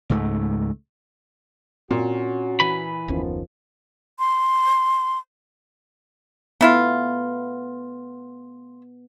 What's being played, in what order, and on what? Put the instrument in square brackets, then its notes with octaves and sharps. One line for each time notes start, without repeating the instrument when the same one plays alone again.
[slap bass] C#2 G#2 A3
[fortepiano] A#2 [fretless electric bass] C4 [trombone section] C#4 F#4
[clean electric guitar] E3 B4 B5
[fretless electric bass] F#1 D#2 C#4 [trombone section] D#3 F3 B3
[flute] C6
[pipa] A3 E4 F4 [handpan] B3